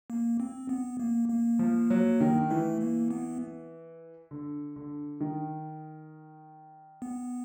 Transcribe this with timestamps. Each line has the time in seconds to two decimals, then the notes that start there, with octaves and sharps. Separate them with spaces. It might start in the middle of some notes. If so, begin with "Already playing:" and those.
0.10 A#3
0.40 C4
0.69 B3
1.00 A#3
1.29 A#3
1.59 F3
1.90 F#3
2.20 D#3
2.50 E3 A3
2.81 A#3
3.11 B3
4.31 D3
4.76 D3
5.21 D#3
7.02 B3